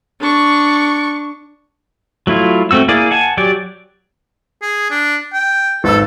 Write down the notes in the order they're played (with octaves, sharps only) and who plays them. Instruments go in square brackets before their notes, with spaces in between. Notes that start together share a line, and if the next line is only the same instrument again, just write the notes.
[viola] D4 C#6
[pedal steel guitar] F#3 A3 E4 F4
A3 C4 F#4 E6
A#3 E4 G#4 D5
F#5 G#5 A5
F#3 G4 D5
[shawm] G#4
D4
G5
[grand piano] G#1 B4 E6 [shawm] A4